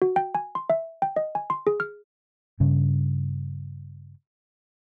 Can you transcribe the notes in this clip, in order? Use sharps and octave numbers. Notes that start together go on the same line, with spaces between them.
F#4
G5
G#5
C6
E5
G5
D#5
G#5
C6
G#4
F6
G2 C#3